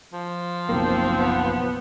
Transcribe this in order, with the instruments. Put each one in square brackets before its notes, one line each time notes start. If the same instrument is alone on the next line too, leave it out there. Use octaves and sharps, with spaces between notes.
[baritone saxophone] F3
[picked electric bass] F#1 B1 A#3 [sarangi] C4
[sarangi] B3